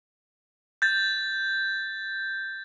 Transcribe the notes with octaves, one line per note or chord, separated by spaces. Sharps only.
G6 A6